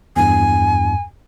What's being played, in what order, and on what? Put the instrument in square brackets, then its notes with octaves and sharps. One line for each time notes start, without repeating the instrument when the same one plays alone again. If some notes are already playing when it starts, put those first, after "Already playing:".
[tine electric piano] E2 G2 [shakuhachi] G#5